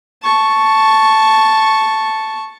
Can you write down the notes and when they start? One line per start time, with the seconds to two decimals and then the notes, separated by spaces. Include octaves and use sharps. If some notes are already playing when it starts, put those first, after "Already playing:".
0.23 A5 C#6